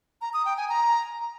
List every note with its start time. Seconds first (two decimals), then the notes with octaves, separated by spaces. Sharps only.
0.21 A#5
0.33 D#6
0.45 G5
0.57 G#5
0.69 A#5